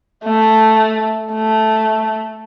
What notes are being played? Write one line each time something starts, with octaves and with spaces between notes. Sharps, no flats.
A3
A3